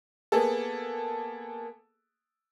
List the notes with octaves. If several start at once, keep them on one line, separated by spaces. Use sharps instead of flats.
A#3 B3 G#4 A4